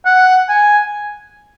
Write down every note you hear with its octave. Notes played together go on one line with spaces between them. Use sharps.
F#5
G#5